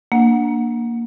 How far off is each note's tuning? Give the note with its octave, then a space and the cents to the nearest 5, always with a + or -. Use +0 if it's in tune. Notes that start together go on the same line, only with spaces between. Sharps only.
A#3 +0 D4 +0 F#5 -15